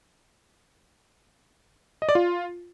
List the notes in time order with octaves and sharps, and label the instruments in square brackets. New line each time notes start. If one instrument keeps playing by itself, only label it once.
[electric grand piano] D#5
D5
F4